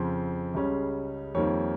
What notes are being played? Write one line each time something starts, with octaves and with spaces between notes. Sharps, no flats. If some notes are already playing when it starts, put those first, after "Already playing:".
Already playing: F2 C#3 F3 C4 C6
C#2 C#3 G3 C#4
F2 D#3 G3 A#3 C#5